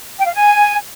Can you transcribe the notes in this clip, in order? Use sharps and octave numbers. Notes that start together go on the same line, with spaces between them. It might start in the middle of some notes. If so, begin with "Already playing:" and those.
G5
F5
G#5